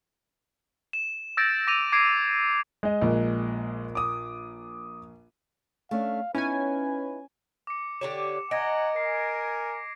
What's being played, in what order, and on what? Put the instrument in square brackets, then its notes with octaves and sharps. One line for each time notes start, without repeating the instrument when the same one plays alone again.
[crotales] E7
E6 G6 A6 A#6 D7
D6 A#6 D#7 F7
D6 G#6 C7 D7
[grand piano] G#3 D#5
[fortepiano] A#1
[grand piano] D6 D#6
[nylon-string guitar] A3 C#4 D4 [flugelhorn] F5
[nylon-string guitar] B3 D#4 E4 [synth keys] C#4 G#5 [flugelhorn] B4
[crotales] D6 C#7
[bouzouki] D3 G4 C#5 [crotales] E7
[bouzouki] D#5 [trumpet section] F#5 G#5 A#5 [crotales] G#6 A#6 D7
[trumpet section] A#4 G#5 [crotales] C7